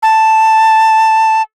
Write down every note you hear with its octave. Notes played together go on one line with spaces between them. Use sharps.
A5